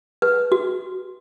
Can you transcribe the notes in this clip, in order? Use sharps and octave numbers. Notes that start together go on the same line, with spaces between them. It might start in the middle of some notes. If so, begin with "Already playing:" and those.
B4
F#4